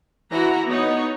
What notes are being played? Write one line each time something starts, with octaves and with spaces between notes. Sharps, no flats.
E3 E4 F#4 A#5
B3 D#4 C#5